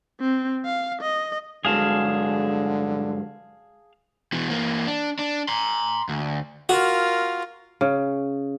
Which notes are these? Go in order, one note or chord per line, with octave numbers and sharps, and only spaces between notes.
C4
F5
D#5
G2 D3 F#3 G#3 G#4 F5 A5
B2 E3
E3 A#3
D4
D4
A#5 C6
D2
F4 F#4 A#4
C#3